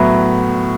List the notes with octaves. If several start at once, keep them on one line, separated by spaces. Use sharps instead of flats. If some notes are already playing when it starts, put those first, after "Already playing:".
Already playing: A2 F#3 B3 E4